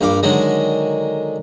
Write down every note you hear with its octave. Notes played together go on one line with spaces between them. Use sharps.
A#1 G2 F5 D6
D3 D#3 F#3 G#3